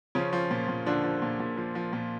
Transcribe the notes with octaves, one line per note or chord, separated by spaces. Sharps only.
C#3 F3 C#4
F3
A#2
A#2
D3 F3 D4
F3
A#2
A#2
F3
F3
A#2